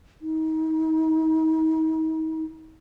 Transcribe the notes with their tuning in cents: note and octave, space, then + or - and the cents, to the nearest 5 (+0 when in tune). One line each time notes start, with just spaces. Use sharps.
D#4 +35